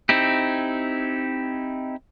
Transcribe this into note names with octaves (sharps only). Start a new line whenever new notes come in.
C4 D#4 E4 G4